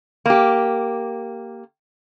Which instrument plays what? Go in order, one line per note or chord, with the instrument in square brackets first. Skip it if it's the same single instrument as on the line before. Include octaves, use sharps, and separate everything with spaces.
[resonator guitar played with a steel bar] A#3 G4